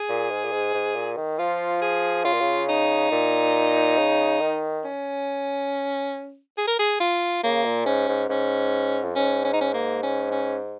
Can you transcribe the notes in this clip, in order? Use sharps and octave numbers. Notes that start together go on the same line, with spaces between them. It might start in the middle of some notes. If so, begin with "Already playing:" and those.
Already playing: G#4
A#2
G#2
A#2
G#2
G#2
A#2
D#3
F3 F4
G#4
C#3 F4
A#2
C#3
D#4
A#2
C#3
D#3
C#4
G#4
A#4
G#4
F4
C#3 A#3
A#2
G#2 C#4
G#2
G#2 C#4
F2
G#2 C#4
C#4
D#4
C#4
A#3
C#4
C#4